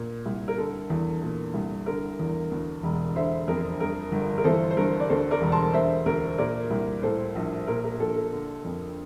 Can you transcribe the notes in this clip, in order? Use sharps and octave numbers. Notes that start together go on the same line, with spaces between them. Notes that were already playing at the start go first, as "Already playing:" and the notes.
Already playing: A#2
C2
A#4
D3 A4
E2
A#2
C2
D3 A#4
E2
D2
E1
D3 C5 E5
F2 A#4
G2 A#4
G1
A#4
E3 A4 C5
C5
G2 A#4
D5
D2 A4 C5
A#4 D5
E1
A5 C6
D3 C5 E5
D2 A#4
A#2 A#4 D5
C2
A2 A4 C5
A#1
A#2 A#4
A#4
A#1 A4
A4
D3
F2